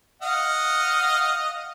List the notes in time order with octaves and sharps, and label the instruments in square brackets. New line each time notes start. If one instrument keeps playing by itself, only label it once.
[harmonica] D#5 F5 F#5